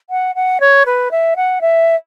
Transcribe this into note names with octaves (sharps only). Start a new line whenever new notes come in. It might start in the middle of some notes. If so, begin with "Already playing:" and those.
F#5
F#5
C#5
B4
E5
F#5
E5